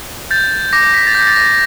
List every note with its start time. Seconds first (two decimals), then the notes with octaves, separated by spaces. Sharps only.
0.31 G6 A6
0.73 D6 A#6
0.94 B6
1.07 A6
1.15 G6 A#6
1.27 A6
1.36 A#6